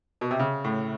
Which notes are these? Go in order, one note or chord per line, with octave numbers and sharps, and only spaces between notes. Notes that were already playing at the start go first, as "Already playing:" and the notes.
B2
C3
C#3
A2